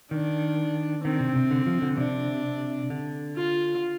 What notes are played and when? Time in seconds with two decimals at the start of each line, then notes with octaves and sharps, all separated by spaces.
0.11 D#3 D4
1.04 D#3 C4
1.20 C3
1.36 C3
1.51 D3
1.66 F3
1.82 D3
1.97 C3 D4
2.90 D3
3.36 F4